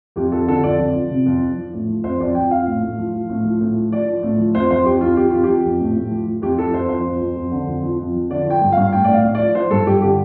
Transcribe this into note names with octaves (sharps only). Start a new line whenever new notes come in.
F2 G4
F2 A4
D3 A4
F2 D5
F2
F3
C3
F2
F3
F3
A2
F3
F2 C5
F2 D5
F2 G5
F3 F5
A2
A2
F3
F3
A2
F3
A2
F3
F3 D5
F3
A2
F3
F2 C5
F2 C5
F2 G4
F2 F4
F3 G4
F2 F4
F3 G4
F2
A2
A2
F3
F3
F2 G4
F3 A4
F2 C5
F3 C5
F2
F2
F2
D3
F2
F3
F2
F3
D3 D5
F3 G5
G2
G2 F5
A2 G5
A2 D5
F5
A2
F3 D5
F3 C5
G2 A4
G2 G4
D3 G4